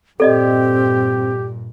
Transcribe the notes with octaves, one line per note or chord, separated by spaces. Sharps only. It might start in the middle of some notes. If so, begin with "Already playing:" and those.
G2 A#2 C4 G4 A4 D5 D#5